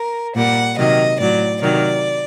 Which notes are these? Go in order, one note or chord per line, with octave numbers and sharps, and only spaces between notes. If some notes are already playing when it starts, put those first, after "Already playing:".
Already playing: A#4
A#2 G3 F#5
C3 D#3 F#3 D#5
A2 F#3 D5
C3 D#3 F#3 D5